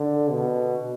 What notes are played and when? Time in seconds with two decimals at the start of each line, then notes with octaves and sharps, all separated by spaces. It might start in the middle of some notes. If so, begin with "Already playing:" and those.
Already playing: D3
0.31 B2